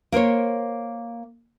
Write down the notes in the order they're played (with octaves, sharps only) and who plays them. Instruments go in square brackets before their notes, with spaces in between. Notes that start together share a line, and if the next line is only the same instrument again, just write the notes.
[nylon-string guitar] A#3 A#4 C5 C#5